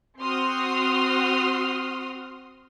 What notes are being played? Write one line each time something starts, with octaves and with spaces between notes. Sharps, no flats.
C4 F#4 C6 D#6 F6